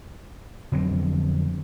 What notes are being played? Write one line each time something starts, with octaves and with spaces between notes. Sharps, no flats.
F2 D3 F#3 C4